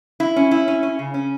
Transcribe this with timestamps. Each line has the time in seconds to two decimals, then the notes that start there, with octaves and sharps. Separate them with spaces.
0.20 E4
0.36 C#4
0.51 E4
0.68 C#4
0.83 C#4
0.99 C#3
1.14 C#4